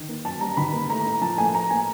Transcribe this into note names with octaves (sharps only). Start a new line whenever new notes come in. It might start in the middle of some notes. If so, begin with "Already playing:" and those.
Already playing: D#3
A#3
F#2 A5
G3 A#5
D#3 B5
A#3
A2 A#5
A#3
F3 A5
A2 G#5
A2 A#5
A#3 G#5